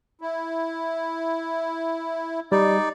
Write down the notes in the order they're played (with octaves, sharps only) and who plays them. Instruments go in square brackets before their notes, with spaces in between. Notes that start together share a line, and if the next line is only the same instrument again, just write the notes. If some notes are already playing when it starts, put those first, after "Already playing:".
[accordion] E4
[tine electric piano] G3 [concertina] D#4 D5